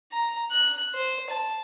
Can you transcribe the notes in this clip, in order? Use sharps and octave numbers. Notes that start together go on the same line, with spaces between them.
A#5
F#6
C5
A5